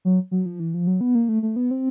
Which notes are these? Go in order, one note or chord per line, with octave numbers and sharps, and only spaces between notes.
F#3
F#3
F3
E3
F3
F#3
B3
A#3
A3
A3
B3
C4